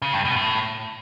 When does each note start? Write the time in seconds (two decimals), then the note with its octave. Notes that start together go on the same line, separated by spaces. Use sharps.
0.02 C#3
0.14 G2
0.25 B2
0.36 A2